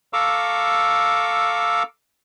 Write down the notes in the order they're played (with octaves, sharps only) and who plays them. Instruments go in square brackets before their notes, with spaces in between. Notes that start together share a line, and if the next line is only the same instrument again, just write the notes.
[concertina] A4 F5 A#5 C#6 D6 E6